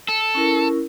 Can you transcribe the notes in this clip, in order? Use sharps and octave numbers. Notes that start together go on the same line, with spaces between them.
A4
C#4 E4 A#4